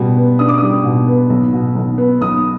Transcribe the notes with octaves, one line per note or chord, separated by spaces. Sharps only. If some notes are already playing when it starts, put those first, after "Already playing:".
Already playing: B2 G3
B3
D4 D#6
D6
G3 D#6
B2
B3
B1
B2
B1
B3
B1 D#6